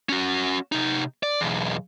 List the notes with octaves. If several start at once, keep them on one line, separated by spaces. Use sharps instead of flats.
C#4 F#4
C3 D#4
D5
B1 E2